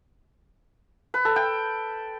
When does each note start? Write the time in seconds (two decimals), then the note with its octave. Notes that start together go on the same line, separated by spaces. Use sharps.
1.14 B4
1.25 A4
1.36 G5